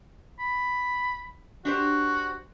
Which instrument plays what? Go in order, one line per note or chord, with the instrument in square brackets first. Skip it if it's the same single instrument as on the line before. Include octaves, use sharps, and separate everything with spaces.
[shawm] B5
[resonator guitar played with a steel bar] D4 G4 C5 [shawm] F#4